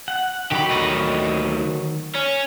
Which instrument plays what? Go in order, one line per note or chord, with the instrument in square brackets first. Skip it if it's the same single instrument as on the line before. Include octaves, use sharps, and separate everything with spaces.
[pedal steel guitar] F#5
[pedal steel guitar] D#3 F#3 B5 [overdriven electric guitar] G4
[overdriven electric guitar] D2 D#4
C#4